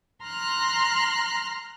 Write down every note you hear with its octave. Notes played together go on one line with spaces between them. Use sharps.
A#5 C6 F6 F#6